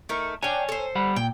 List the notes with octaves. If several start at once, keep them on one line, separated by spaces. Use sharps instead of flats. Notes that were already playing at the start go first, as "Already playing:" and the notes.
A3 D#4 A#4
D4 C#5 G5 G#5
A4 C5
G3 F#5 B5
A#2 G5